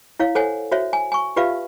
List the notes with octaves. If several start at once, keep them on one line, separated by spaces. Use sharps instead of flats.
E4 C#5 F5
A4 C5 C#5 F#5 G#5
F#4 C5 C#5 E5
G#5
G#5 C#6
F4 G4 B4 D5 E5 F5